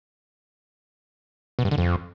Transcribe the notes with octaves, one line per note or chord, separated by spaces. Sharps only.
B2
G2
D3
F2